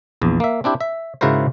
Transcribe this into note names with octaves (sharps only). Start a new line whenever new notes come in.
A#1 E2
A#3 E5
C4 D4 E4 G4
E5
G#2 C#3 E4 F#4 A#4 C5